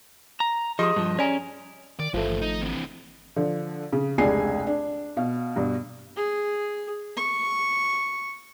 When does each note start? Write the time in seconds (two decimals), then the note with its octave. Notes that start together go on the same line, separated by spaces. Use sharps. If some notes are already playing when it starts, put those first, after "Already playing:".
0.40 A#5
0.79 F3 G4 G#4 D#5 C6 D#6
0.96 G2 F3
1.19 C#4 D5 G#5 A#5
1.99 D#3 D5
2.14 G#1 G2 E3 F3 A3
2.42 D#4
2.62 C3 E3
3.36 D3 F3
3.93 C#3
4.18 F1 C#2 D4 G#4 G#5 C7
4.67 D4
5.17 B2 F5
5.56 G2 B2
6.16 G#4
7.17 C#6